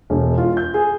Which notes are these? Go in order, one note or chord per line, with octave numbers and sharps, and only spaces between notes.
E1
F4
G6
G#4